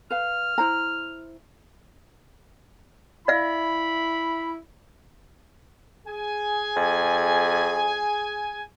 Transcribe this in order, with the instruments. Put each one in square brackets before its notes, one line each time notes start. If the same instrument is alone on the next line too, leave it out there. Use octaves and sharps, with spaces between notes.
[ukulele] B4 F5 [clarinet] F6
[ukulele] E4 C5 A#5
[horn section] E4 B5 [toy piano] D5 F5
[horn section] G#4 G#5
[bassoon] F2